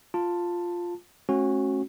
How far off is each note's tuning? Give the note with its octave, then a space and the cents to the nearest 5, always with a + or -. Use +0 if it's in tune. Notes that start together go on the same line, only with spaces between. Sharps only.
F4 +0 A5 +10
A3 -35 C#4 -30 F#4 +0